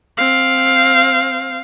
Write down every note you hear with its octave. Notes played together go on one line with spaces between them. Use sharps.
C4 F5